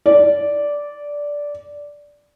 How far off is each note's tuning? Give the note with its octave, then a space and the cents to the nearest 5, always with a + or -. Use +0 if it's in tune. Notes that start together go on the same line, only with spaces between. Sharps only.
D5 -10